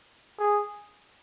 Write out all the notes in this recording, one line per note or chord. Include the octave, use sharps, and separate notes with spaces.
G#4